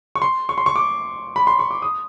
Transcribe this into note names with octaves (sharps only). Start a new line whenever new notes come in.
C#6
C6
C#6
C6
C#6
D6
B5
C6
C#6
D6
D#6